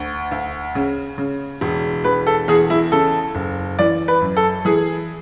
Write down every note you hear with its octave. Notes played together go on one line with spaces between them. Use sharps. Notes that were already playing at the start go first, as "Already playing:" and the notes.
Already playing: D2
D2
C#3
C#3
E1
E1 B4
A4
E2 G#4
E4
C#3 A4
F#1
E3 D5
B4
F#2
A4
E3 G#4